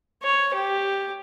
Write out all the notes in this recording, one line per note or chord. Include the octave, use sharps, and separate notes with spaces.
C#5
G4